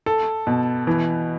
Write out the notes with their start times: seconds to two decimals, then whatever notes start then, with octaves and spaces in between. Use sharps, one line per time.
0.06 A4
0.47 B2
0.87 E3